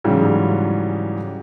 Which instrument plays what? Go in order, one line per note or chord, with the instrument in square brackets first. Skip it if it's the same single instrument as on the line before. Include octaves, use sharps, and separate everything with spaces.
[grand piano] G#2 C#3 E3 F#3 G3